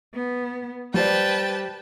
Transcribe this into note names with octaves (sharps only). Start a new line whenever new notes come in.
B3
G3 B4 C5 D5 G5 A5